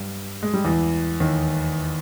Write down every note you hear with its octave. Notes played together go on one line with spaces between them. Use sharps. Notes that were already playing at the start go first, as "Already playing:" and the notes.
Already playing: G2 G3
G#3
G3
E2 E3
D#2 D#3